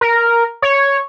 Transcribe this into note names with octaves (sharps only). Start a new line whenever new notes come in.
A#4
C#5